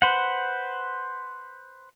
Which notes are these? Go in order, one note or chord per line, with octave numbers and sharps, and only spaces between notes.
B4 C5 F#5